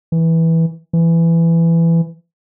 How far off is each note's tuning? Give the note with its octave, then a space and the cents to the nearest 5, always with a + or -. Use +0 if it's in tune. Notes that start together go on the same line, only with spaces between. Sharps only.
E3 -10
E3 +15